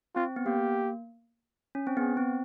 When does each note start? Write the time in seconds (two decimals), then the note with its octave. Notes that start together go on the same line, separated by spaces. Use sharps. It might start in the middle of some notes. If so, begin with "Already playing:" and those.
0.15 C4 F4
0.36 B3
0.46 A#3 G4
1.75 C#4
1.87 C4
1.97 B3 G#4
2.17 C4